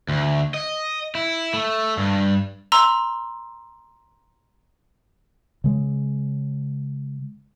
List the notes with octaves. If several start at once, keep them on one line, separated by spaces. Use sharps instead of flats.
D2
D#5
E4
A3
G2
A#5 C6 E6
C#3 G#3